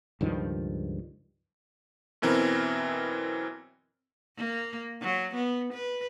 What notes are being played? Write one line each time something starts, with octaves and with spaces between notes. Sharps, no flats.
C#2 G2 D#3 F3
F#2 B2 E3 C4 E4 A#4
A#3
F#3
B3
B4